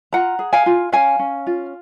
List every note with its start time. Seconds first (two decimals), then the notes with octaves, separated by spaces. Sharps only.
0.13 F4 F#5 A#5
0.39 G#4
0.53 F5 G#5
0.66 F4
0.92 C#4 F5 G#5
1.19 C#4
1.47 F4